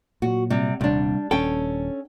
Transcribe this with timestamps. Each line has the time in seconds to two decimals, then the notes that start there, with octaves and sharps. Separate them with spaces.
0.22 A#2 F#3 F#4
0.50 C3 G3
0.81 D#1 C2 G3 D4
1.31 D#1 C#4 A4 G5